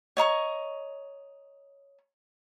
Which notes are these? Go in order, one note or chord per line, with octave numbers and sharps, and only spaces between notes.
C#5 D#5 A#5 C#6